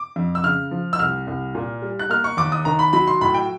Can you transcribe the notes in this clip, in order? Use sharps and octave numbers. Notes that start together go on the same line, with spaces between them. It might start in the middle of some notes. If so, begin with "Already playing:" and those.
Already playing: D6
F2
E6
C#3 F6
F3
E6
C2 F6
C2
A#2
G3
F#6
A#3 F6
C#6
D#2 D6
D#6
D#3 A#5
B5
F#3 B5
C6
A2 B5
G5